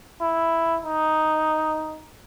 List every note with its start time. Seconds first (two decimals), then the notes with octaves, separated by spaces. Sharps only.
0.21 E4
0.85 D#4